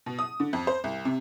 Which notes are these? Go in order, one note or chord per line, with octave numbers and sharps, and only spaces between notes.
B2
D#6
D3
F2
C5
C2
C3